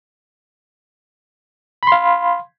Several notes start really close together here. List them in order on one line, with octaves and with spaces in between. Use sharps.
B5 C6 F5